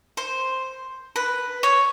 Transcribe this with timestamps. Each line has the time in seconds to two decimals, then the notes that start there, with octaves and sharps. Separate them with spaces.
0.17 C5
1.16 B4
1.63 C#5